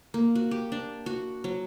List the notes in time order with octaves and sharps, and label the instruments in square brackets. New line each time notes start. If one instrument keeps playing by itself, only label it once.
[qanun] A#3
F#4
G4
D4
F#4
F#3